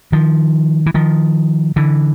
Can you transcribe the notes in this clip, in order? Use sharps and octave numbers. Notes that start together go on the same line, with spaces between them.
D#3 F3
E3
D#3 F3
D3 E3